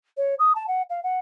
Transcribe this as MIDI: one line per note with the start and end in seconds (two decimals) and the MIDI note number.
0.17 0.35 73
0.39 0.53 87
0.55 0.66 81
0.68 0.82 78
0.90 1.03 77
1.03 1.19 78